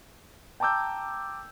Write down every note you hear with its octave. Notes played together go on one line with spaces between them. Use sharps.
G5 A5 A#5 D6 E6 G6